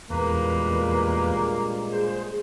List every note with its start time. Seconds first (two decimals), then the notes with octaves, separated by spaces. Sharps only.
0.10 E2 G2 A#2 G#3 A#3 B4
1.92 G#4 C5